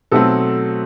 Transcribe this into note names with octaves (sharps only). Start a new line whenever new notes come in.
B2 F#3 A3 C4 A4